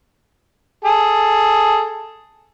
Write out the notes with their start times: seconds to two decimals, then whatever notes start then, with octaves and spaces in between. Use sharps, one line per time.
0.85 G#4 A4